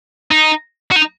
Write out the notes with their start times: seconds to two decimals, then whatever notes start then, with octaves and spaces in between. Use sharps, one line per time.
0.32 D#4
0.91 F#4
0.96 D#4